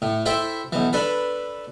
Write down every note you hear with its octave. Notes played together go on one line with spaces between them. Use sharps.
A2
E4 A4 C5 E5 G5
B1 E3
D4 A4 B4